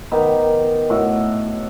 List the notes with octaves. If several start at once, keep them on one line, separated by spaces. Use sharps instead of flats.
D#3 B3 G4
A2 F#4